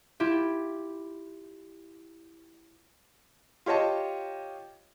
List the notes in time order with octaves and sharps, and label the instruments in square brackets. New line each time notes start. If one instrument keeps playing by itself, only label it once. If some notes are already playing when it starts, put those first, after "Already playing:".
[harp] E4 F4 G4
[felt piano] F4 G4 C#5 D#5 A5